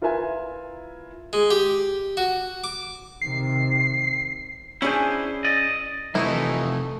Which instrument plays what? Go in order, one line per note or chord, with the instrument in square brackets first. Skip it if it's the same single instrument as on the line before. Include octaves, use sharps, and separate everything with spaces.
[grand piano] E4 F4 A#4 B4 E5 G#5
[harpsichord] G#3
G4
F#4
D6
[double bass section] C3 D#3 [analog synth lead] C7
[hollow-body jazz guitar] C#4 D4 G#4 [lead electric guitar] E4 C5
[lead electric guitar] D5 D#5
[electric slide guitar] F2 C3 F3 [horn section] E3 D#4 [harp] A3 [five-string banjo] E4